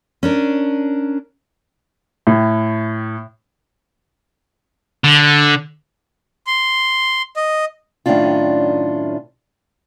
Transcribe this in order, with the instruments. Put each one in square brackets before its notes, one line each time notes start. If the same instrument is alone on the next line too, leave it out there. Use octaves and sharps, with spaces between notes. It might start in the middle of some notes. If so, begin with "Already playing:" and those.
[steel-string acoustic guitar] C#4 D4 A#4
[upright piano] A2
[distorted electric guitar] D3
[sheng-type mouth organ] C6
D#5
[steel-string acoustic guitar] F#2 A2 D#3 C#4 D4 F4